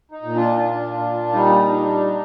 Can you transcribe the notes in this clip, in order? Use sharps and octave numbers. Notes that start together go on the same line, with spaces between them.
D#4
A#2
D4 F4
D4
A#2
G3 D#4
D4